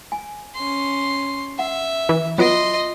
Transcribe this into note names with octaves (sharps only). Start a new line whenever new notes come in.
G#5
C#4 C6
E5 F#5
E3
F#3 B3 F4 D#5 C6 D7